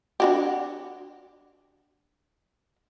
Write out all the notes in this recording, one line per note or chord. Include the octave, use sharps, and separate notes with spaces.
D4 F#4 G4